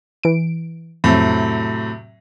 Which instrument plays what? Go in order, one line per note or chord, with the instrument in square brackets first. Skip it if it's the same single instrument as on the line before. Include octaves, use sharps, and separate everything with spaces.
[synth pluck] E3 D7
[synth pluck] F2 [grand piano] A2 C3 F#3